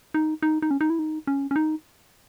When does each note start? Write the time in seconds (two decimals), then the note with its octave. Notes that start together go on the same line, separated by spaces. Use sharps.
0.14 D#4
0.43 D#4
0.62 D#4
0.71 C#4
0.81 D#4
0.90 E4
0.99 D#4
1.27 C#4
1.51 C#4
1.56 D#4